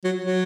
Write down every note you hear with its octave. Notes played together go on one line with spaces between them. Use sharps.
F#3
F#3